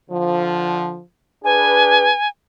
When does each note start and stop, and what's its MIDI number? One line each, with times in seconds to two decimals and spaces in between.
0.10 0.99 50
0.10 0.99 53
1.44 2.12 62
1.44 2.12 68
1.44 2.12 71
1.44 2.28 80